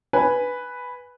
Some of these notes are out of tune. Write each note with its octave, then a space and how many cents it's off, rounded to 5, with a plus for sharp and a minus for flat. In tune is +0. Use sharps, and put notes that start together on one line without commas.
B4 +0 G#5 +0